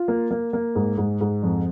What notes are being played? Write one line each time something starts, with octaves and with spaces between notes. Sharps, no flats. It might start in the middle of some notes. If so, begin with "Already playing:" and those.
Already playing: F4
A#3
A#3
A#3
G#2
G#2
G#2
F2